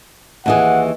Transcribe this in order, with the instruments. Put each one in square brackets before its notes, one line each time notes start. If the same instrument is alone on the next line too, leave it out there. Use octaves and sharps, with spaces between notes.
[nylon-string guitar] D#2 E3 G#4 [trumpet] F#5